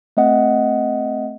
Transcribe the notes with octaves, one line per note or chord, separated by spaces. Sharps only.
A3 C4 D#5 F#5